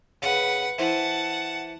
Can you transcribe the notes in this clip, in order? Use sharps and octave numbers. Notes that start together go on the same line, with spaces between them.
C#3 B4 F#5
E3 E4 C5 F#5 A5